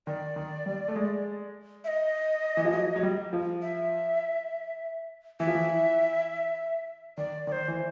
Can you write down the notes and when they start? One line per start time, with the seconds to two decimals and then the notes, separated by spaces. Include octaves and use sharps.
0.07 D#3 D5
0.36 D#3
0.66 G3
0.88 A3
0.96 G#3
1.84 E5
1.88 D#5
2.57 E3
2.65 F3
2.73 F#3
2.96 F#3
3.03 G3
3.33 F3
3.62 E5
5.40 E3 E5
5.47 F3
5.55 E3
7.17 D#3 D5
7.47 D#3 D5
7.52 C5
7.68 E3